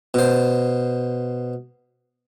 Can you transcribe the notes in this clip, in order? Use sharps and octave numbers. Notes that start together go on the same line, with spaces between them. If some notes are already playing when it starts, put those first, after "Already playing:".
B2 C5